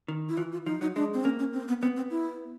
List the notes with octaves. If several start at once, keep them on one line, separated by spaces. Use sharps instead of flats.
D#3
E4
E3 F4
F4
F3 D#4
F#3 D#4
G#3 D4
C4
A#3 C#4
C#4
C4
B3
B3 C4
C4
E4